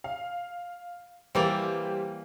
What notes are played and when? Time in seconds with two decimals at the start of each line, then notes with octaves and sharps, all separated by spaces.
0.04 F5
1.35 E3 G3 A#3 C5 D5 G5